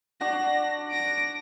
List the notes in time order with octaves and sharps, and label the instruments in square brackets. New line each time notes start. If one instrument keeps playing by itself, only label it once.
[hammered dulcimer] D4 F#4 [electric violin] A#6
[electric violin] A#6 D7